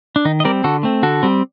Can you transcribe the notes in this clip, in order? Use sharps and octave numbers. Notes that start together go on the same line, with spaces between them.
D4
D#3 D#4
D#5
G3 C4 A#4 D5
D3 F#4 A4
A3 C4
D3 F#4 A4
G3 C4